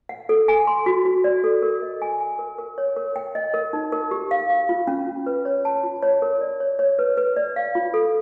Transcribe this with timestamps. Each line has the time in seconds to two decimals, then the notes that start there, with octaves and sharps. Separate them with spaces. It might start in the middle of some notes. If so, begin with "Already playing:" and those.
0.09 F#5
0.29 A4
0.48 G#5
0.67 C6
0.86 F#4
1.05 F#4
1.24 D5
1.44 A4
1.62 A#4
1.82 D#5
2.02 G#5
2.20 G#5
2.39 A#4
2.58 A#4
2.78 C#5
2.97 A#4
3.16 G5
3.35 D#5
3.54 A#4
3.73 D#4
3.92 A#4
4.11 G4
4.31 F5
4.50 F5
4.69 F4
4.87 C#4
5.07 F4
5.26 B4
5.45 C#5
5.65 A5
5.83 F4
6.02 C#5
6.22 A#4
6.41 D5
6.60 C#5
6.79 C#5
6.99 B4
7.17 B4
7.37 D5
7.56 F5
7.75 F4
7.94 A4